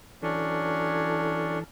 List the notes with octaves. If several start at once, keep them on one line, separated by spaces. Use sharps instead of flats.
E3 F#3 C#4 D4 A4